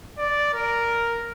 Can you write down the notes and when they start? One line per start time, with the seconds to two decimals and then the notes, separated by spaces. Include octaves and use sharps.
0.18 D5
0.53 A#4